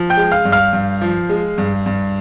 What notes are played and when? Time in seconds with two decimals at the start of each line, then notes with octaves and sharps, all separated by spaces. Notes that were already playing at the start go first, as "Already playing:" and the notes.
Already playing: F3
0.10 G5 G6
0.17 G#3
0.32 F5 F6
0.45 G2
0.52 F5 F6
0.73 G2
1.01 F3
1.29 G#3
1.58 G2
1.86 G2